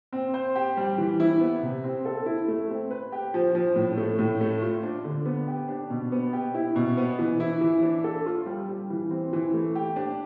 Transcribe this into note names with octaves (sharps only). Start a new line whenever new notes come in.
C4
C5
G4
G3
E3
E4
B3
C3
C4
A4
E4
A3
C4
B4
G4
F3
F3
A2
A3
A2
A3
F4
D4
D3
B3
G4
D4
B2
B3
G4
E4
B2
B3
E3
E4
E3
D4
A4
F4
G3
G3
E3
C4
E3
A3
G4
D4